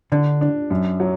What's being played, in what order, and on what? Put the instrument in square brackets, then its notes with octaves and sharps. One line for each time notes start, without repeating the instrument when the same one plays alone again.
[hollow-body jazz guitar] D3 [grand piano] D4
[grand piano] D4
F#2
F#3